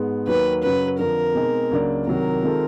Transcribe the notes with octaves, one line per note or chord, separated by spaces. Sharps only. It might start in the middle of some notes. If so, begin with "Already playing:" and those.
Already playing: G#2 G#3 B3
D#2 D#3 F#3 A#3 B4
F#2 C#3 F#3 B4
F2 D3 F3 A#4
B2 G#3 C4 D#4 G#4
C#2 C#3 F#3 A#3 D4
C2 C3 D#3 F#3 A#4
D#3 G#3 C4 F4 A4